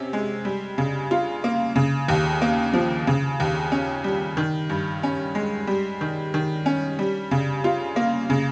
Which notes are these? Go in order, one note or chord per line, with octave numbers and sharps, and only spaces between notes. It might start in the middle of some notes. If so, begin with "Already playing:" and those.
Already playing: C3 C#4
G#3
G3
C#3
F4
A#3
C#3
D#2
A#3
F3
C#3
D#2
C#4
G3
D#3
G2
C#4
G#3
G3
D#3
D#3
C#4
G3
C#3
F4
A#3
C#3